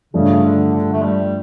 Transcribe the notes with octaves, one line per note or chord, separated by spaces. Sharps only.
G2 C#3 F3 A3 D4
D3
D3
A3
G3